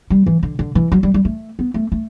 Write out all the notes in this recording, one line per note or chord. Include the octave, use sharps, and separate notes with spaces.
G3
E3
D3
D3
E3
F#3
G3
G3
A3
B3
A3
A3